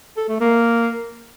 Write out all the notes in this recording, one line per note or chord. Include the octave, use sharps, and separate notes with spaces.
A4
A3
A#3